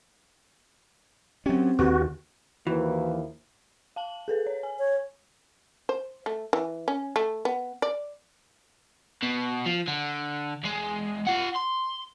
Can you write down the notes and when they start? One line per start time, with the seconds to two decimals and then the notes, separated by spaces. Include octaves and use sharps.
1.46 F#3 C4 C#4 G4
1.79 D#2 D3 F#4 G4 B4
2.67 D#2 E3 F3 A#3 E4 F#4 B4
3.96 F5 A5 F#7
4.28 G#4 A4 B4
4.47 C#5
4.63 G#5
4.79 C#5
5.89 C5
6.26 A3
6.53 E3
6.88 C#4
7.16 A3
7.45 B3
7.82 D5
9.22 B2
9.66 F3
9.88 D3
10.63 E2 G#3
11.27 F4 F#5
11.56 C6